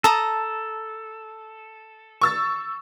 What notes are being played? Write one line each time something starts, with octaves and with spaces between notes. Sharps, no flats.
A4 A5 A#5 D#6
C#6 E6 A6